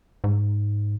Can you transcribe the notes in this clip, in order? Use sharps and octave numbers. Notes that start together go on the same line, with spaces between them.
G#2